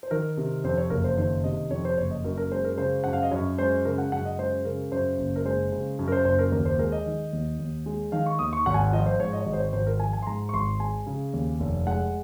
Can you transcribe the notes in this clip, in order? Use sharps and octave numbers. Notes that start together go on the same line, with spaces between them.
C5
D#3 A#4
C3
F2 C5
C#5
F#1 A#4
C5
D#3 C5
C3 D#5
F2 C#5
C5
F#1 C#5
D#5
F#2 A#4
A#4
G#3 C5
A#4
C#3 C5
F#2 F#5
F5
D#5
F#2 C#5
G#3 C5
C#3 A#4
F#5
F#2 F#5
D#5
G#3 C5
C#3 A#4
F#2 C5
F#1
A#4
G#3 C5
C#3
F#2
A#4
C5
F#1 C5
A#4
D#2 A#4
C5
G#3 A#4
D#5
D#3
D#2
D#2
G#3
D#3 F5
C#6
D#2 D#6
C#6
G#1 F#5
G#5
F#5
F3 D#5
C5
G#2 C#5
D#5
C#5
G#1 D#5
C5
C#5
G#1 C5
A#4
F3 G#5
G#5
C6
G#2 A#5
C#6
G#1 C6
G#3 G#5
C#3
D#2
F1
G#3 F#5